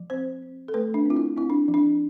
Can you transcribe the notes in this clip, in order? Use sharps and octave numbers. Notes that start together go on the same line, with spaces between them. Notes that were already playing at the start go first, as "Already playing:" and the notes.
Already playing: F3
C4 C5
C4
A4
A3 B4
D4
C4 F4
E4
C4 E4
D4
F3
D4